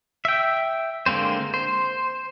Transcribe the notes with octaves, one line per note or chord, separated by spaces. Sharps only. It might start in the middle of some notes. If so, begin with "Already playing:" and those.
E5 G5
D3 G#3 A#3 C4 C5
C5